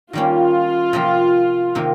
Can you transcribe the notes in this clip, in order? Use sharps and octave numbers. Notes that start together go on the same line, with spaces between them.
D#3 G3 A#3 C#4 F4
C3 F3 A#3
C3 D#3 A#3